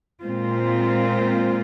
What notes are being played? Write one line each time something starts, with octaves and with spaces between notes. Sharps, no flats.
A#2 G#3 C4 F4